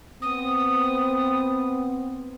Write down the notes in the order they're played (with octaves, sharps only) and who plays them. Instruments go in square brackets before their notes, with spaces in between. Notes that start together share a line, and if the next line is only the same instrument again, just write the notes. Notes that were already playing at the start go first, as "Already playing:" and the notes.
[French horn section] B3 C4 [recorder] D#6